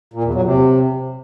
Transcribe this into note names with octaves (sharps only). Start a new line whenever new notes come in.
A#2
E2
F#3
C3